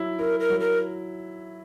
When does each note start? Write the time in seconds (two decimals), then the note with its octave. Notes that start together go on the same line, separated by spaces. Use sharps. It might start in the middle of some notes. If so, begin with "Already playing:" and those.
Already playing: F#3 E4
0.19 E4 A#4
0.40 A#4
0.50 F#3
0.60 A#4